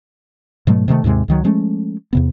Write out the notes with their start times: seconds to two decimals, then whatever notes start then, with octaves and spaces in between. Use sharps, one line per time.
0.67 G#2 B2 F#3 A3
0.88 C3 D#3 F#3 A3
1.04 D#2 G#2 C3 G#3
1.28 C#2 D#3 F#3
1.44 F3 G#3 A3 C#4
2.13 E2 C3 B3